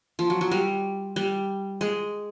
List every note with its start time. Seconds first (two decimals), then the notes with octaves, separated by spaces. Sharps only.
0.19 F3
0.30 F#3
0.41 F#3
0.51 G3
1.16 G3
1.81 G#3